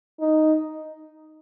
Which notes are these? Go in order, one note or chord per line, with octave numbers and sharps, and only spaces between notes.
D#4